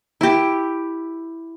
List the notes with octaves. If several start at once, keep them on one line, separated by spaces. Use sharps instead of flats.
E4 G4